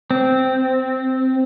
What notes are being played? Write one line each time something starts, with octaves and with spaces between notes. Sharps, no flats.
C4